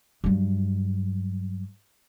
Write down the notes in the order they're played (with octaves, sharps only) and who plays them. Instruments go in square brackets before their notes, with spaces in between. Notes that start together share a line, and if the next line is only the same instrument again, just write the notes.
[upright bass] G2 F#3